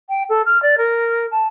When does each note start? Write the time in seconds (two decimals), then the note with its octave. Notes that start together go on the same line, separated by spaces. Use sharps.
0.09 G5
0.29 A4
0.46 F6
0.62 D5
0.78 A#4
1.31 A5